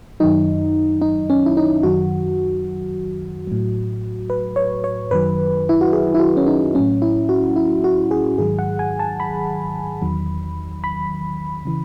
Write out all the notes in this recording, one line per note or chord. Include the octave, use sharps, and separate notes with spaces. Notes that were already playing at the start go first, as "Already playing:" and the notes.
F#2 D#3 F#3 D#4
D#4
C#4
E4
D#4
F#2 D#3 F#3 F#4
A2 F#3
B4
C#5
C#5
F#2 D#3 F#3 B4
E4
F#4
G#4
E4
F#4
C#4
D#4
A2 F#3 C#4
E4
F#4
E4
F#4
G#4
G#2 D#3 F#3 G#4
F#5
G#5
A5
B5
E2 D#3 F#3
B5
C#3 E3